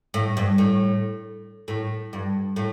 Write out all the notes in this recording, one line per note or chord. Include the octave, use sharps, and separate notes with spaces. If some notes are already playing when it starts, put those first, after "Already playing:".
A2
G2
A2
A2
G2
A2